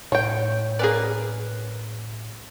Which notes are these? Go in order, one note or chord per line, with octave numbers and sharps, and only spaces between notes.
A2 C#5 G5
A#3 C#4 G#4 B4 D5